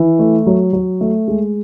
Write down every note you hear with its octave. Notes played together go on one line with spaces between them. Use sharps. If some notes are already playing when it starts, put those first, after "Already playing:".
Already playing: E3
A3
F#3
F#3
A3
G#3